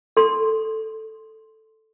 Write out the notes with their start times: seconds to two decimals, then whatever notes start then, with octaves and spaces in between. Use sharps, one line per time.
0.17 A4 C6